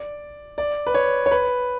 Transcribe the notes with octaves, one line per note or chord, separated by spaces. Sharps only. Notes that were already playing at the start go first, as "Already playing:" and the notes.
Already playing: D5
D5
B4
C#5
C#5
B4